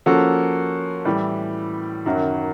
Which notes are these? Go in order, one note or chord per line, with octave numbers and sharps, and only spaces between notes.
F3 A#3 C#4 F#4 A4
A2 E3 G3
F#2 D#3 F#3